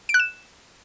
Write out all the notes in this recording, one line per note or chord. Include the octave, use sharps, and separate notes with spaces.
D7
F#6
E7